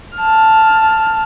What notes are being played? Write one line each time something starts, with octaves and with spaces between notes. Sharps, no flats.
A5 F6